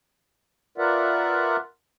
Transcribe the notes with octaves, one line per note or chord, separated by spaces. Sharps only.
F4 A#4 B4 D5 E5 F#5